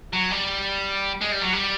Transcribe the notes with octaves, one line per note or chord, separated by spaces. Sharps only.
F#3
G3
G#3
G3
F#3
G3